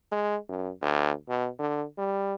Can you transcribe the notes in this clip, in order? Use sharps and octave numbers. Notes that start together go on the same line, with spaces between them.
G#3
F#2
D2
B2
D3
G3